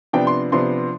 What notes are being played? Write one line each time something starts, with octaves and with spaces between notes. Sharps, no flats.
C3 F3 B3 D4 G5
C6
C3 F3 B3 D4 C6